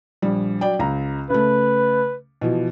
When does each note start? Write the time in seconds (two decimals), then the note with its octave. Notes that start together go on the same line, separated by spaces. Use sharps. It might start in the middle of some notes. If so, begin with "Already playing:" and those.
0.22 A#1 G3
0.61 F#3 D5 G5
0.79 C#2 A#5
1.30 C#3 A3 B4
2.41 B2 E3 F3